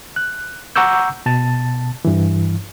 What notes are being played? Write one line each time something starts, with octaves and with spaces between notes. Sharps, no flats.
F#6
F#5 A#5 C#6 D6 E6 G6
B2 A5 A6
G2 E3